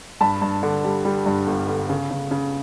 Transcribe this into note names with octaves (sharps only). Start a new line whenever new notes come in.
G2 A5 B5
G2
D3
G3
G3
G2
G1
D3
C#3
C#3
C#3